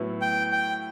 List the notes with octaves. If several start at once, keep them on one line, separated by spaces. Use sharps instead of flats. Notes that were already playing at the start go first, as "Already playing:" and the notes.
Already playing: A2 F#3 B3 E4
G5
G5